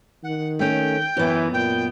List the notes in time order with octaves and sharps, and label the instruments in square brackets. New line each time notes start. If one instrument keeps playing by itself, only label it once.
[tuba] D#3 [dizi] F#5
[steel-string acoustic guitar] A3 C#4 [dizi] G5
[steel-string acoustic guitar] F#2 B3 [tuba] E3
[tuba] A#2 [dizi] G5